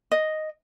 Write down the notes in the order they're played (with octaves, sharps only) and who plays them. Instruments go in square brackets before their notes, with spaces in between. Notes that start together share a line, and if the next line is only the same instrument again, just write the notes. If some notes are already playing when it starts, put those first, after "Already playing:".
[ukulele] D#5